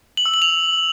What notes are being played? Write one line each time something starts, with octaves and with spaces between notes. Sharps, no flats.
F#7
E6
F#7
F7